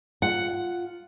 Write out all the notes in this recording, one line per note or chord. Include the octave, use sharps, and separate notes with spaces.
F4 F#5